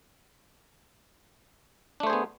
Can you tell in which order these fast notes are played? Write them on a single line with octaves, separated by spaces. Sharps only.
D4 A3 C5 G#4 B3